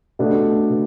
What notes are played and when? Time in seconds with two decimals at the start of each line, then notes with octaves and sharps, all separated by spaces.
0.19 B2 A3 D4 A4
0.70 B2